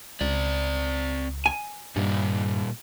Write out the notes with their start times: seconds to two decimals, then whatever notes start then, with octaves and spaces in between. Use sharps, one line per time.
0.21 C#2 C4 D5
1.46 G#5
1.96 G2 A#2 G3